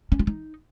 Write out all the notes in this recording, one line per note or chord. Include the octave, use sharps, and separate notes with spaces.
C#4
F4
D#4